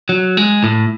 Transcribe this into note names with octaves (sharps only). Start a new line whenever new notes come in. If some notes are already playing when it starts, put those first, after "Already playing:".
F#3
G#3
A2